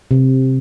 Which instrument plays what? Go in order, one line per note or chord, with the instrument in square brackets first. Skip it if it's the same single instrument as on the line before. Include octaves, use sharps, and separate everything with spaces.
[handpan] C3